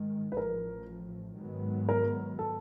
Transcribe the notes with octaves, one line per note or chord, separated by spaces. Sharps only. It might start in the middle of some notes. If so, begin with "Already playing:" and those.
Already playing: G#2 D#3 G#3
B4
A1 A2 F3 A#4
G#2 D#3 F#3 B3
A#4
A4